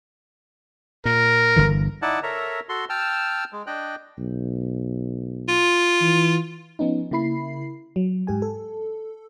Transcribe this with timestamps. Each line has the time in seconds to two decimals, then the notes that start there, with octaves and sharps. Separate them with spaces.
1.05 A#2 A#4
1.56 G1 D3 E3
2.02 D#4 E4 D5 F#5 A5
2.23 A4 A#4 C#5 E5 A#5
2.69 F#4 A4 C6
2.90 G5 A5 E6 F6
3.53 G#3
3.67 D4 D#5 G5 F#6
4.18 B1
5.49 F4
6.01 E3
6.79 F3 B3 C#4 D#4
7.11 C#3 A#3 E4 B5 C7
7.96 F#3
8.27 G#2 G4 G#5
8.42 A4